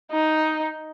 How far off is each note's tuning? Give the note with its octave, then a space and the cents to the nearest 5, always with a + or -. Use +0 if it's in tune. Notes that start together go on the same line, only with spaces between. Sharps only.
D#4 +5